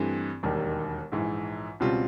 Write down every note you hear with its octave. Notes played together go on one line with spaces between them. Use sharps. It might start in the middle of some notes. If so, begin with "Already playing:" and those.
Already playing: G2 E3 A3 C4
E1 D#2 D#3 G3
A#1 G#2 E3
C#2 B2 G3 C4 F4